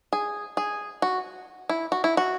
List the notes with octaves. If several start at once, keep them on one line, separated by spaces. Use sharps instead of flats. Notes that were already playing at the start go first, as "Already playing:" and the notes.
G#4
G#4
F#4
E4
F#4
E4
F#4